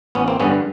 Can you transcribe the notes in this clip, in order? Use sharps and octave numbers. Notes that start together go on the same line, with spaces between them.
A1 B3 C#4
A#3 C4
G2 D3 G3 B3 C#4